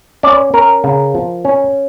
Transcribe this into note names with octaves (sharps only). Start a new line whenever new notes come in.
C#4 D5
C#4 A#4
C#3
F3
C#4